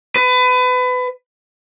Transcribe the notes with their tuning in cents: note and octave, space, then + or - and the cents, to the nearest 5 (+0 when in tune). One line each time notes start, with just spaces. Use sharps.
B4 +25